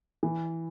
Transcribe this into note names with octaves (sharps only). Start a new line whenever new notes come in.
E3